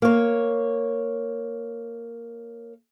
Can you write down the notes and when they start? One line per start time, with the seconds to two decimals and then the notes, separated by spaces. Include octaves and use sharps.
0.02 A#3 C#5